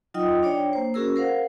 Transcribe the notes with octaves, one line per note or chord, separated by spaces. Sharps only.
F#3 D#4 F4 D#5 G5 D#6
D4 C#5 D5 G5
A#3 C5
C#4 F#4 G#4 A#4 E6
A#4 C5 F5 F#5